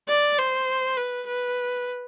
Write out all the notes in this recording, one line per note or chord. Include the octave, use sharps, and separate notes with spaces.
D5
C5
B4
B4